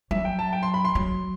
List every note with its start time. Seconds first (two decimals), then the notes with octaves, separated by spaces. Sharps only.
0.11 F#3 E5
0.25 G5
0.39 A5
0.53 G5
0.63 C6
0.74 B5
0.85 C6
0.95 F#3